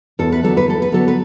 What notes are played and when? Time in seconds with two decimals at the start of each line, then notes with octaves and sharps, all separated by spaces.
0.19 E2 A4
0.32 B4
0.43 D3 F#3 B3 A4
0.57 B4
0.68 E2 A4
0.82 B4
0.92 D3 F#3 B3 A4
1.08 B4